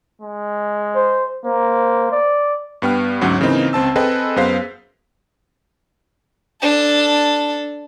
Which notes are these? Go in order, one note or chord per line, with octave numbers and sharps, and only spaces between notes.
G#3
C5
A#3 C5
D5
G2 B3 G5 F6
D2 G#2 F#3 C#4 F#5
C#3 E3 A#3 C4 D#4
C#2 C4 A5 E6
C4 G#4 A4 B4 D#5 G5
F#2 B3 G#4 C5 F5 B6
D4 A4